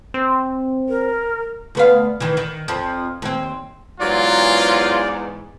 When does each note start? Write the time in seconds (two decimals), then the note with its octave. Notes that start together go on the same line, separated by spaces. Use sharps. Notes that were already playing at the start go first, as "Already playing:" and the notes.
0.14 C4
0.89 A#4
1.75 D2 B3 F5
2.20 D#3 E3
2.37 D#3
2.68 F2 F3
3.22 D#2 C4
4.00 E2 G#2 F#3 F4 D5